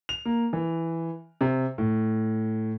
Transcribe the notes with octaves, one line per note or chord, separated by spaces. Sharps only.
F7
A#3
E3
C3
A2